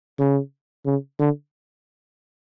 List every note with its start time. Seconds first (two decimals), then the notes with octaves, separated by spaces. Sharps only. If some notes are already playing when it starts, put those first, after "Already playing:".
0.19 C#3
0.86 C#3
1.19 D3